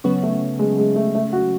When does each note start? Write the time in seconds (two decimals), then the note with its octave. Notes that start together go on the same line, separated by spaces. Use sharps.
0.04 C#3 F#3 B3 C#4
0.23 A3
0.59 G#3
0.78 G#3
0.95 A3
1.15 A3
1.33 F#4